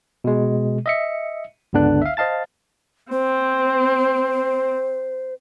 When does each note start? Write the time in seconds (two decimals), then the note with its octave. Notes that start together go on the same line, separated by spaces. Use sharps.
0.24 B2 G#3
0.86 D#5 E5 C#7
1.73 G1 C#2 D3 B3 D4 F#6
2.02 E5 F5
2.17 C5 D#5 F5 A5 A6
3.12 C4 C5